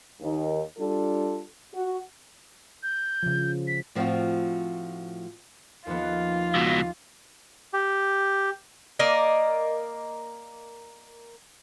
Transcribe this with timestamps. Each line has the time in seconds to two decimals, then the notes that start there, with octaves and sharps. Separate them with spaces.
0.21 D#2 D#3
0.78 G3 D4 F4 A4
1.74 F#4
2.83 G6
3.23 C#3 F3
3.67 B6
3.95 A2 F3 C4 D#4 F4 F#4
5.87 D#2 F3 B3 F4
6.55 C#2 B2
7.73 G4
8.99 A#3 A#4 D5 D#5